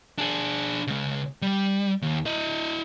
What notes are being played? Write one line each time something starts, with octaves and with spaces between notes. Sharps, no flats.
D4 G#4
C#3 G#3
G3
D#2
E4 D#5